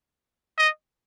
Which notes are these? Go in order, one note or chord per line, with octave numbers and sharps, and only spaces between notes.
D#5